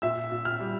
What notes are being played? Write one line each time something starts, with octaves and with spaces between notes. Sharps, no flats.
A#2 E5 E6
A#2
F6
G3